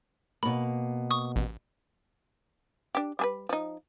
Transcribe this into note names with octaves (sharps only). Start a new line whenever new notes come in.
B2 A#3 B5
C#6 D#6
A1
D4 G4
G3 G#4 B4
F3 D#4